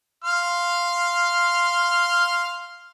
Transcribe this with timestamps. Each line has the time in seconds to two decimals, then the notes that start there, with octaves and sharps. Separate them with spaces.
0.24 F5 C6 F6